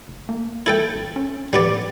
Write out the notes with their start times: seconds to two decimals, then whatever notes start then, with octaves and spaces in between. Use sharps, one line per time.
0.08 F#1
0.29 A#3
0.66 E4 A4 G5
0.95 A1
1.16 C#4
1.53 A2 G3 B3 D5